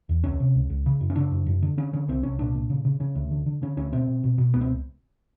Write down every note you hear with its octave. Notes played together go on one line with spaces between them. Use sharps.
E2
C#2 C#4
C3
C#2
C#2
C#3
F#2
C#4
C#3 D4
F#2
F#2
D3
D3 C#4
D3 C#4
C2 C4
C2 C#4
A#2 D4
A#2
C#3
C#3
C#3 C#4
D2
D3
D3
D3 C#4
D2 C#4
B2 C4
B2
B2
B2
C#2 B3
C4